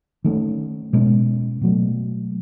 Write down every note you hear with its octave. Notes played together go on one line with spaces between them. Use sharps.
D#3 A3 C#4
B2 G#3 C#4
B2 F#3 A3